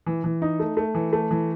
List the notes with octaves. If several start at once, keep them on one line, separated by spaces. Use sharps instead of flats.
E3
E3
D#4
A3
A3
E3
A3
E3